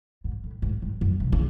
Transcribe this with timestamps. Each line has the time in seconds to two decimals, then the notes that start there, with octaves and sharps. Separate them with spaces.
0.24 G#2
0.44 A2
0.62 G#2
0.82 G2
1.01 F#2
1.20 C3
1.32 C#3